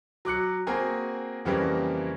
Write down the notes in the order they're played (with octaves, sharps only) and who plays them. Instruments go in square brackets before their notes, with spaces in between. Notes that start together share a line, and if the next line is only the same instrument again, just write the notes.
[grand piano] F#3 D6 F#6 C#7
A#3 C4 F#4 G#4 G#5 A#5
F2 C#3 E3 G3 A#3